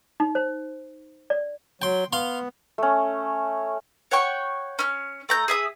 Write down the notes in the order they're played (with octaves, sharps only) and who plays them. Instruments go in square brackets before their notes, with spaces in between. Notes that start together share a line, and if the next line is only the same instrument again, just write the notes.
[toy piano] D#4
C5
D5
[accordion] F#3 [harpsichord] G5 C6
[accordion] B3 [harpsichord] F5 C6
[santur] A3 C#4
[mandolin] C#5 F#5 G5 C#6
C#4 F6
A3 A#5 G6
G#4 E5 D#6